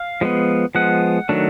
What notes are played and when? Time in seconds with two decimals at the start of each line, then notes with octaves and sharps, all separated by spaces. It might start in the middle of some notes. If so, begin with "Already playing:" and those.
Already playing: F5
0.21 F3 G#3 B3
0.75 F3 G#3 B3 F#5
1.29 D#3 F#3 A3 D4